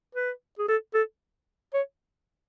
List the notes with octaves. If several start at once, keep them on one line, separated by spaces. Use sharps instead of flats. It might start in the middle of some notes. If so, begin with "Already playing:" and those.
B4
G#4
A4
A4
C#5